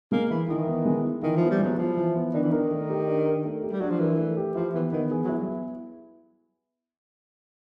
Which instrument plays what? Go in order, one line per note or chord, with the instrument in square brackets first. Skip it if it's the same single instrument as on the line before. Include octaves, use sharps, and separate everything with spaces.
[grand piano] G#3 [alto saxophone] A#3
[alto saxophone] E3 [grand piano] E4
[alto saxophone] D#3 [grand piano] E3
[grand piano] B3
G#3
E4
[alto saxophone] D#3 [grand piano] E3
[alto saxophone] F3
[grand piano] B3
[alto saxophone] G3
[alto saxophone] F#3 [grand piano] G#3
[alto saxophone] F3 [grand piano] E4
[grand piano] E3
B3
[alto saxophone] D#3 [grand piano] D4
[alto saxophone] E3
[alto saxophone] D#3 [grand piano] A#4
[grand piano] A3
G4
D4
A#4
A3
G4
[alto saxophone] G3
[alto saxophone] F#3 [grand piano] D4
[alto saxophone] F3
[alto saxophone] E3 [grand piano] A#4
[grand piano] A3
G4
[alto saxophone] F3 [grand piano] E4
[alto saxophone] E3 [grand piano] B3
[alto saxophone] D#3 [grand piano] B3
[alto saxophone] E3 [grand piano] G#4
[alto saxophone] F#3 [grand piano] E4
[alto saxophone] G3
[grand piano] B3